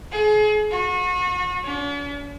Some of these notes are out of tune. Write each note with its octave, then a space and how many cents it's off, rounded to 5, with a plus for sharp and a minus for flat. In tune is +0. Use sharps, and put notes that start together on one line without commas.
G#4 +35
F#4 -35
D4 -45